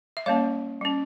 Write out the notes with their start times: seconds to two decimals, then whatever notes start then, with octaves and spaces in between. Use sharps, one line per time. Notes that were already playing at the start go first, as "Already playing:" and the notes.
0.17 E5
0.26 G3 A#3 C#4 C#5 F5
0.81 G3 C#4